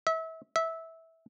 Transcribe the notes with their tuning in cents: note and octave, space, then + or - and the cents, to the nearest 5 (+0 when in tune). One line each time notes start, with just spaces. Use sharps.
E5 -30
E5 -15